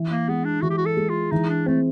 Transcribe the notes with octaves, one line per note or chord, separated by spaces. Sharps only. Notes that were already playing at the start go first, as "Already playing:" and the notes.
Already playing: E3
A#3
G#3 B3
D4
E3 F#4
G4
F#4
A4
G#3
F4
E3 D#4
D4
A3 C4